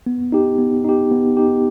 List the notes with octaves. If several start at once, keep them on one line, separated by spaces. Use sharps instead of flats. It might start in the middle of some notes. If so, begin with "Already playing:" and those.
B3
D#4 G4
B3
D#4 G4
B3
D#4 G4